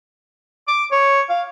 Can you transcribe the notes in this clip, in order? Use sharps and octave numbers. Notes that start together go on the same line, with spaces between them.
D6
C#5
F5